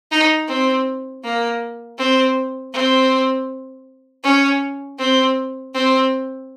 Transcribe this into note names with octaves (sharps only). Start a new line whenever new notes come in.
D#4
C4
A#3
C4
C4
C#4
C4
C4